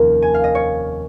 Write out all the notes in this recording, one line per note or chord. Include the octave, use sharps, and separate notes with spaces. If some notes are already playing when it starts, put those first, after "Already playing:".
Already playing: F1 D#2 D#3 C#4 A#4
G#5
F5
D#5
C#5